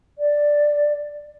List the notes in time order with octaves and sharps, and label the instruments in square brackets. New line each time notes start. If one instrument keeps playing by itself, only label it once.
[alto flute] D5